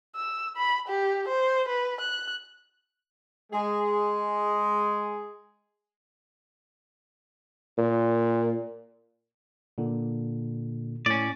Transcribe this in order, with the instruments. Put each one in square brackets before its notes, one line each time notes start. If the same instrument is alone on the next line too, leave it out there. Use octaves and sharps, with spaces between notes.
[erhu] E6
B5
G4
C5
B4
F#6
[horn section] G#3 G#4
[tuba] A#2
[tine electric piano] A#2 D3
[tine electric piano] A2 [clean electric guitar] C#4 D5